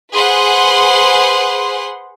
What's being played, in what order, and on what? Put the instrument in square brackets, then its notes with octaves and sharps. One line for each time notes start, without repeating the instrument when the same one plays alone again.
[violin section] G#4 B4 C5 F#5 C6